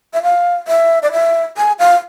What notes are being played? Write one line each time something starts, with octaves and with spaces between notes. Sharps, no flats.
E5
F5
E5
D5
E5
G#5
F5